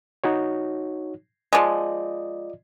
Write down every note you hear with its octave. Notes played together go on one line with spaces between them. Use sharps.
D#4 F#4 C#5
F3 G#3 F4 D5 D#5